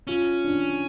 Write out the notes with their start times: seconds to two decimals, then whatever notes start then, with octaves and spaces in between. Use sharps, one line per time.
0.07 C#4 F4
0.45 D4